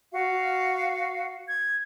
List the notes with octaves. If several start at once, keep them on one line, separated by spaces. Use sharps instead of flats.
F#4 F5
G#6